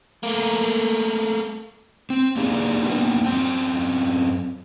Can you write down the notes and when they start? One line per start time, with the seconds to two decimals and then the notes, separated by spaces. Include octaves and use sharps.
0.23 A3 A#3
2.10 C4
2.37 A#3 D4 D#4 G4 G#4
2.83 A#3 B3 D4 D#4
3.26 F#2 C4 G5